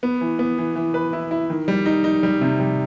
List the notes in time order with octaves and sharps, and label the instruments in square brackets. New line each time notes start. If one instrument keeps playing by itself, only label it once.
[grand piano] B3
E3
B3
E3
E3
B4
E4
E4
D#3
G3
D#4
D#4
G3
C3
G3